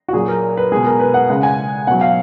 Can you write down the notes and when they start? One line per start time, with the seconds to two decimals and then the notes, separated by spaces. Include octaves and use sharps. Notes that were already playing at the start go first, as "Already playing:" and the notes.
0.08 F#4
0.13 A#2 F#3 G#4
0.28 A#4
0.57 B4
0.72 B2 G#3 G#4
0.86 A#4
1.00 B4
1.14 F#5
1.29 C#3 G#3 F#5
1.43 G#5
1.87 B2 F#3 F#5
2.01 F5